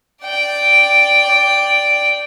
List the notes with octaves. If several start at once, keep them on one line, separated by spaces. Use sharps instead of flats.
D5 G5